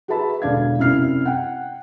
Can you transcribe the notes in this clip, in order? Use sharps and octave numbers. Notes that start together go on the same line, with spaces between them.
F#4 G#4 B4 E5 A5 B5
E1 D3 D5 F5 G#6
F#2 C3 E4 D5 F6 C7
F#5 G5